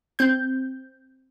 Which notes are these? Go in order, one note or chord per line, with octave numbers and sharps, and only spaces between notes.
C4 G6